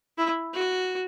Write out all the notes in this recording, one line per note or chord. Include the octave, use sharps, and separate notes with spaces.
E4
F#4